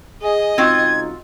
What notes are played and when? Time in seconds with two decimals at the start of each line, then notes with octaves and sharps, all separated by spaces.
0.22 G#4 D#5
0.58 C#2 C4 D#4 F4 F#4 G#6